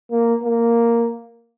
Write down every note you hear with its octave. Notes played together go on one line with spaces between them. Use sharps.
A#3
A#3